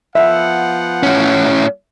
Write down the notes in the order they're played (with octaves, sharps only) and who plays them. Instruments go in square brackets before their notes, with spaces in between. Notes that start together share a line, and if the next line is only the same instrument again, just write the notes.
[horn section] F3 B3 F#5 [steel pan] E5
[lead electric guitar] A2 C#4